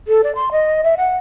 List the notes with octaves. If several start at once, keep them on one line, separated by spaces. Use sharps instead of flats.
A4
D5
C6
D#5
E5
F#5